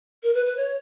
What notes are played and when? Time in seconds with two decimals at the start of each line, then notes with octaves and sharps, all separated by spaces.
0.23 A#4
0.34 B4
0.45 B4
0.57 C#5